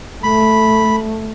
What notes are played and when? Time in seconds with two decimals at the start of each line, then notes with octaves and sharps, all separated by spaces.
0.23 A3 B5